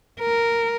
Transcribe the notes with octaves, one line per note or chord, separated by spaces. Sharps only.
A#4